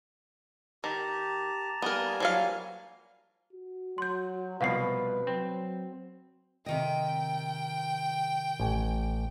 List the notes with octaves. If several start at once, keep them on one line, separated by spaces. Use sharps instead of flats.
D#3 G4 A5 A#5
G3 A#3 B3 A#4 G#5
F3 F#3 F5
F#4
F#3 C6 G6
C2 B2 F3 B4 F5 F#5 C7
F#3 C4
C3 D#3 D#5 G5
A1 G#5